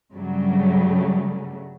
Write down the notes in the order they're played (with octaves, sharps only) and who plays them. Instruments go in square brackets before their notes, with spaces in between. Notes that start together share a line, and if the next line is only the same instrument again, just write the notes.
[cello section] G2 C#3 F#3 G3 A3